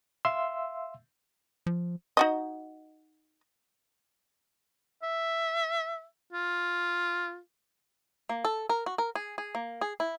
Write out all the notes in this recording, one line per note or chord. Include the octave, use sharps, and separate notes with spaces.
E5 F5 C6 E6
F3
D#4 F#4 D#5
E5
F4
A#3
A4
A#4
F#4
A#4
G#4
G#4
A#3
G#4
E4